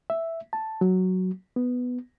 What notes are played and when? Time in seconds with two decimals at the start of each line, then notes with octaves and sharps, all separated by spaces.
0.10 E5
0.53 A5
0.81 F#3
1.56 B3